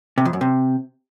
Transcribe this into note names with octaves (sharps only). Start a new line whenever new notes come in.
C3
F2
F#2
C3